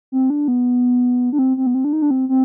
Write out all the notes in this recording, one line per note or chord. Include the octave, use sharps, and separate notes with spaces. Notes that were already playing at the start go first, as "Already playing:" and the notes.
C4
D4
B3
D4
C4
C4
B3
C4
D4
D#4
D4
C4
C4